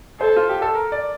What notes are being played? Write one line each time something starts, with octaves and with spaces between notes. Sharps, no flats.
A4 C5
F4
G4
A4
A#4
D5